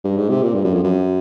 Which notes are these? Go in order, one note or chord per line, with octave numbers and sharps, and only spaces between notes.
G2
G#2
C3
A#2
G2
F#2
F2
F#2